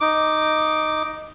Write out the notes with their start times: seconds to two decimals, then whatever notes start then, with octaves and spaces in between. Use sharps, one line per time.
0.01 D#4 D6